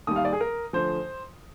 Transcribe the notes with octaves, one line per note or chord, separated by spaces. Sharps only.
D#2 D#3 G3 D#6
F5
D5
G#4
A#4
D2 D3 F3 C5